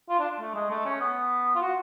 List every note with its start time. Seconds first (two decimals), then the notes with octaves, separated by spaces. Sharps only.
0.09 F4
0.19 D4
0.40 A3
0.55 G#3
0.70 A3
0.85 C#4
1.00 B3
1.55 F4
1.62 F#4